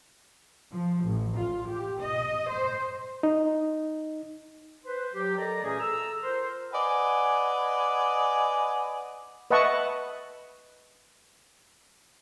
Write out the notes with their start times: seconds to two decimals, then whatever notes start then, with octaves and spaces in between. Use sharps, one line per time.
0.71 F3
1.05 A1
1.37 F4
1.69 G4
2.01 D#5
2.48 C5
3.23 D#4
4.84 B4 C5
5.13 F#3 G4
5.38 A4 A#4 D5 D#5 A5 A#5
5.63 A#2 E3 A3 C#4 G4 G#4
5.80 A4 A#5 E6
6.23 F4 A#4 C5
6.73 B4 D5 D#5 F#5 G#5
9.51 B4 D#5 E5 F#5 A5 C#6